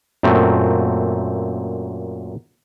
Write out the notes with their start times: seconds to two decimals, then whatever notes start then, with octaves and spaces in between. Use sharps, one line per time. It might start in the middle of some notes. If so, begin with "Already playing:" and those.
0.23 F#2 A#2 A3 C4